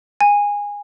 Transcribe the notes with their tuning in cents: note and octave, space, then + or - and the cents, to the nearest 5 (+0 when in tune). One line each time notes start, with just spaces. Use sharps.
G#5 -20